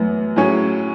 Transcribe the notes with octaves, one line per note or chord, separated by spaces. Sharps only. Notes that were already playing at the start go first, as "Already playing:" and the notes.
Already playing: F#2 E3 A3 B3
A2 F#3 C#4 G#4 C#5